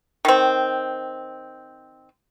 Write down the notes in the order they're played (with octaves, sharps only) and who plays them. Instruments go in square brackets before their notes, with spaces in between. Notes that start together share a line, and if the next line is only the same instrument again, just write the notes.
[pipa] D#3 C4